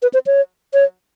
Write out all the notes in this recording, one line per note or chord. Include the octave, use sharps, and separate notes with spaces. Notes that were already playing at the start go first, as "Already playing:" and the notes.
B4
C5
C#5
C#5